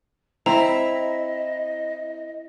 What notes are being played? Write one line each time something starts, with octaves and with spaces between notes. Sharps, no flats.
C4 E4 D#5 A#5